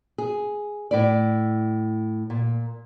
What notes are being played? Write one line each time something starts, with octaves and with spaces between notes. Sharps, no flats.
G#4
A2 E4 D5
A#2